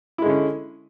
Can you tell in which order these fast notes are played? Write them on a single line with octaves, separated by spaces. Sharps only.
E4 G#3 D3 C#4